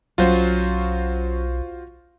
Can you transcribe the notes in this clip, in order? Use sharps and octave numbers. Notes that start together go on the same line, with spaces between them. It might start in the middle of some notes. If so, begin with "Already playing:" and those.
B1 F#3 C#4 F4 F#4 C5